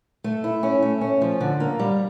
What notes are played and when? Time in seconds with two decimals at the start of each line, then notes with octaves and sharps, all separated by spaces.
0.24 A3
0.44 E4
0.63 C#4
0.83 A3
1.01 C#4
1.21 F3
1.41 D3
1.60 A#3
1.79 G3